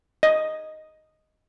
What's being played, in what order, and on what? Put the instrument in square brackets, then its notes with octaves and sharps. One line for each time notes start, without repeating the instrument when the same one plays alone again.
[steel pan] D#5